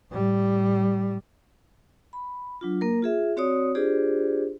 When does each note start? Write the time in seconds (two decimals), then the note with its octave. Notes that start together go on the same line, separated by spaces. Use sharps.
0.11 A2 G3
2.13 B5
2.61 F#3 D4 F4
2.81 A#3 A#4
3.02 F4 G#4 E5
3.37 C4 F#4 C#5 D5 D#6
3.75 D4 F4 G4 G#4 C5 D5